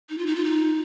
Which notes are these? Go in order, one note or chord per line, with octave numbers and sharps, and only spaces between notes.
D#4
F4
D#4
F4
D#4